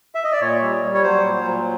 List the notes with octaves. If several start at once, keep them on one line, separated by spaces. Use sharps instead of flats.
E5
D#5
D5
A#2 C#5
G3
G3
C#5
F#3 C5
A#2
F#3